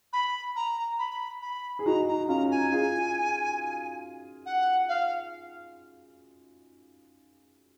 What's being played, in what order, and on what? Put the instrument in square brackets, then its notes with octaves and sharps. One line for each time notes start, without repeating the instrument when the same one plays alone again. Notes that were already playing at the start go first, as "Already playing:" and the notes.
[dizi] B5
A#5
B5
B5
[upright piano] G#4
[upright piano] D#4 F#4 [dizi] A#5
[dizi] A#5
[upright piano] C#4 F4 [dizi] A#5
[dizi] G#5
[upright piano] F4 G#4
[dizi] F#5
F5